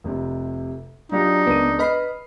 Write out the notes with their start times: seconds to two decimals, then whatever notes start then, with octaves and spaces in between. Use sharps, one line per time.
0.04 F1 C3
1.12 F#3 D4 D#4 F4 G4
1.47 C#2 B3 A#4 D#7
1.79 B4 D#5 B5 F6 C7